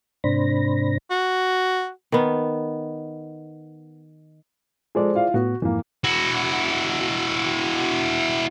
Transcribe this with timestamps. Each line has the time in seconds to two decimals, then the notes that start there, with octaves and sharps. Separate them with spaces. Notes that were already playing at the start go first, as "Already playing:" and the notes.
0.24 G#2 C3 D4 C5 B5 A#6
1.11 F#4
2.12 D#3 B3
4.95 F3 G#3 G#4 A4 C5 D5
5.15 E4 F4 F5
5.34 A2 B3 F#4
5.62 F2 G#2 E3 A#3
6.04 E4 F#4